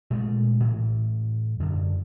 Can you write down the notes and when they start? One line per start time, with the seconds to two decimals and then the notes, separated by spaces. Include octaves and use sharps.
0.11 A#2 G#3 A3
0.60 A2 E3
1.60 F#2 D3